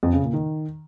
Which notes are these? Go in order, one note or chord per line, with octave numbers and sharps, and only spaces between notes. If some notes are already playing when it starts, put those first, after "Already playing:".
F2
C#3
A#2
D#3